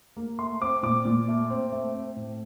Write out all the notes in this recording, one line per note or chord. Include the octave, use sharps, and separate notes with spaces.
A#3
A3 C6
C4 D6
A#2 D6
A#2
A3
C4
A3
C4
A2